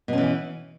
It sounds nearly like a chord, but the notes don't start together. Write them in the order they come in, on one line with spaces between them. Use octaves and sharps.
B2 C#4 E3